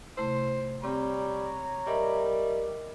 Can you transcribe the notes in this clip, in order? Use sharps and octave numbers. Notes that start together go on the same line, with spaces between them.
C3 A3 E4 C5
G3 C4 G4 C#5 A#5
G3 A#4 D#5 E5